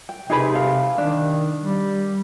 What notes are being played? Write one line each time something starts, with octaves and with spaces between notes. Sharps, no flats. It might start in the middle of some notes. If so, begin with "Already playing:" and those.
G5
C3 D#4 G#4 B4
A4 F5
D#3 D4
G3